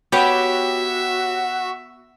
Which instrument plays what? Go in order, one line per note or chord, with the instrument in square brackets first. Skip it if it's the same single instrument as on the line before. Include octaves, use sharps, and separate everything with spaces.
[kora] B3 F#5 [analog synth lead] F#4 [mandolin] G4 C#5 [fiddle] E5